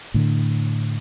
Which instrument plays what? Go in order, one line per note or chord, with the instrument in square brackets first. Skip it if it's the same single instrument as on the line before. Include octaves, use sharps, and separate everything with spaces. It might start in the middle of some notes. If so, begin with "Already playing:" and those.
[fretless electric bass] A2 D3